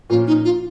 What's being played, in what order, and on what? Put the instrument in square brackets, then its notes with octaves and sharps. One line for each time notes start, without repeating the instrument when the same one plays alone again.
[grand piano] A#2 F3 A#3 C#4 [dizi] F4
[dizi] D#4
F4